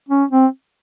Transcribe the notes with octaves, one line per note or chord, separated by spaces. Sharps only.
C#4
C4